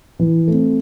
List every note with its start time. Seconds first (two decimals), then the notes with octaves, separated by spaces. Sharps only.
0.19 E3
0.48 A3 C4